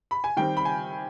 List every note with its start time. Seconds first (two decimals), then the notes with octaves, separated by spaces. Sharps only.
0.11 B5
0.24 G#5
0.37 D#3 G3 C4 G5
0.57 B5
0.65 G#5